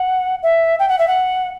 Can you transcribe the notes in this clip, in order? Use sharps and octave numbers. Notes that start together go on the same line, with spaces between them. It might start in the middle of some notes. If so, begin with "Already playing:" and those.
Already playing: F#5
E5
G5
F#5
E5
F#5